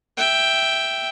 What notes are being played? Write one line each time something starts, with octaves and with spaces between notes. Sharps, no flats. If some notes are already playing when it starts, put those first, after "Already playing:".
E5 G5